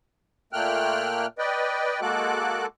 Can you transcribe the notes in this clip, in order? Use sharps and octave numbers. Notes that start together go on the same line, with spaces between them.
A#2 A3 A#3 G5 F6 F#6
B4 D5 D#5 G5
G#3 A#3 F#4 A4 D6 F#6